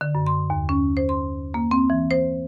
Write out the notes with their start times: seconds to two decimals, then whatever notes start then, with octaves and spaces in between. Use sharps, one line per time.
0.01 D3
0.15 F#2
0.27 C6
0.50 D#2
0.69 C#4
0.97 C5
1.09 C6
1.54 A#3
1.71 C4
1.90 E3
2.11 C5